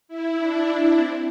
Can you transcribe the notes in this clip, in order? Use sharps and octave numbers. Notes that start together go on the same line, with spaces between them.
E4
D4
C4